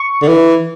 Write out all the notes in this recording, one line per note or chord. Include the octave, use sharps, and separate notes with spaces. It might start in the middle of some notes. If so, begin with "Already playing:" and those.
Already playing: C#6
D3
E3